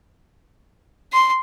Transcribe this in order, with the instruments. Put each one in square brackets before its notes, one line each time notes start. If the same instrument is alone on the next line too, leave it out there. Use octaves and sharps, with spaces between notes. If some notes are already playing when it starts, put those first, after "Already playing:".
[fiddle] C6